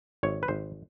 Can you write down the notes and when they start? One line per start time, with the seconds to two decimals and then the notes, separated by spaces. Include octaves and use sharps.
0.23 G#1 C#5
0.43 B4
0.48 G#1 C5